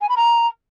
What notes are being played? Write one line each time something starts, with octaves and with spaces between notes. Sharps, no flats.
G#5
B5
A#5